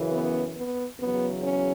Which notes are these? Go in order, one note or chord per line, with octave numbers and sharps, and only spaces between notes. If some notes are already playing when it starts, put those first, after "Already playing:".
Already playing: F#2 C#3 E3
B3
B3
E2 C#3 F#3 B3
C#4